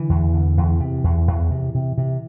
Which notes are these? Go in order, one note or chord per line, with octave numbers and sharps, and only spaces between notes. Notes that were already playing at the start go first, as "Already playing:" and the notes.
Already playing: D3 E3
E2
D3
E2
C3
E2
E2
C3
C3
C3